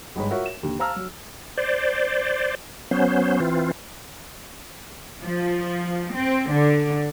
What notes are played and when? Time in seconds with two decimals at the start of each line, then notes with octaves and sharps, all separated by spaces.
0.16 G1 G#2 G#3 C#5 B5
0.30 F4 F#4 A#4 C#5 E5 F#5
0.46 E7
0.63 D#2 D3
0.79 C5 F5 A5 A#5 E6 F6
0.96 F#3
1.58 C5 D5
2.91 F#3 B3 C#4 C5
3.40 E3 C4 F4
5.22 F3
6.14 C4
6.50 D3